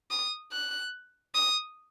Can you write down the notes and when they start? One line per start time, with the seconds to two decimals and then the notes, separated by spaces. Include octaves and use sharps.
0.11 D#6
0.52 F#6
1.34 D#6